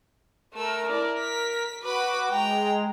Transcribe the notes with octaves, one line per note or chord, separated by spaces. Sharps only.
A3 A#4 E6
E4 D5
B6
F#4 B4 B5 D6
G#3 G5 A#5